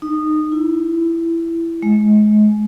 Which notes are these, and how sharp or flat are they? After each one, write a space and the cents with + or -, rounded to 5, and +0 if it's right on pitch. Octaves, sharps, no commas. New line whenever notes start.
D#4 -20
E4 +15
G#3 +30